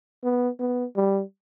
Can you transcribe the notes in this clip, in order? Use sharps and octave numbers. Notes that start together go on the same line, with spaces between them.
B3
B3
G3